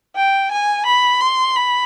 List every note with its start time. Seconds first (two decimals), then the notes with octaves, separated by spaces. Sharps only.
0.16 G5
0.52 G#5
0.86 B5
1.21 C6
1.56 B5